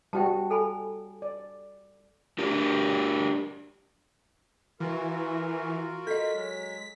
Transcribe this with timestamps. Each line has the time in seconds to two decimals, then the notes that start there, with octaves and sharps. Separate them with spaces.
0.13 G3 F#4 G5 A5
0.50 A4 G#5 B5
1.22 D5
2.39 D4 G4 A#4
4.80 E3 F4 F#4 A#4
6.07 A4 D#5 B6
6.35 F#3 G#3